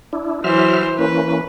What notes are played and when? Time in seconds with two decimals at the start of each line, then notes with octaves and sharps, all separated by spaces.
0.13 D4 E4
0.44 E3 F#3 C5 E5 F6
0.99 E3 A#3 C#4 B4